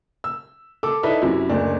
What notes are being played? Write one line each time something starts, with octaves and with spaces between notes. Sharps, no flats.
E6
A4 D6 E6
D#4 E4 A4 B4 D5 E5
F#2 C3 F#3 E4
F#1 D2 D4